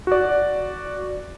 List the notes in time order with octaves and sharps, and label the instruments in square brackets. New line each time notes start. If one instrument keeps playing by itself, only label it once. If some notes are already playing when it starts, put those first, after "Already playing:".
[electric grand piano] F#4 D5